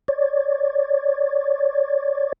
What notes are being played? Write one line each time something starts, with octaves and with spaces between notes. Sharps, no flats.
C#5 D5